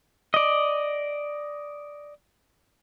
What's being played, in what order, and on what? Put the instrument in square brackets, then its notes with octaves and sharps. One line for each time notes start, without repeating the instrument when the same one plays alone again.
[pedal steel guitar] D5 D#5